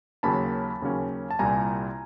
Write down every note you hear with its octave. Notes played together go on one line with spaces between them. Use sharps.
D#2 C#3 F#3 A#3 C#4 A5 B5
D#2 C#3 F#3 A#3 C#4
A5
C2 A#2 G3 G#5 A#5